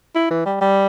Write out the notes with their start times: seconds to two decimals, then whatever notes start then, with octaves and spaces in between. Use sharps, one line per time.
0.16 E4
0.31 E3
0.46 G3
0.61 G3